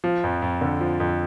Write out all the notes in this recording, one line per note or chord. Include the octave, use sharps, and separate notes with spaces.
F3
F2
F2
D3
F3
F2